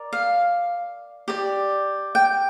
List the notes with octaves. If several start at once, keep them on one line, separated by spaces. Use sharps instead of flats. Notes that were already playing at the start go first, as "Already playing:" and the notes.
Already playing: A#4 D5
F5
G4 D5
G5